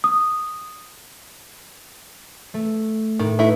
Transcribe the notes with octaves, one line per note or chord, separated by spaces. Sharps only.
D#6
A3
A2 D#3
A3 D#4 E4 B4